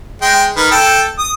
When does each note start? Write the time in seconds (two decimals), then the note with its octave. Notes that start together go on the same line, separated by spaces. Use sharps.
0.21 G#3 G5
0.57 D#3 B4
0.71 A4 G5
1.18 D#6